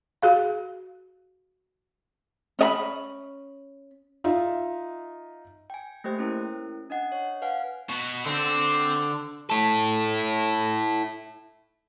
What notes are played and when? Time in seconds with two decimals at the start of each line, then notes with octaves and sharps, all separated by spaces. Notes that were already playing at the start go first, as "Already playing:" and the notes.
0.22 F#4 G#4 F5
2.59 C#4 D#5 B5
4.24 D#4 F4 E5
5.70 G5 G#5
6.04 A3 A#3 G4 C5 G5
6.19 C#4 E4 A#4
6.90 D4 D#5 F#5
7.12 C#5
7.42 B4 F5 F#5 G#5
7.89 B2 F#4
8.26 D3 C4
9.50 E4 A4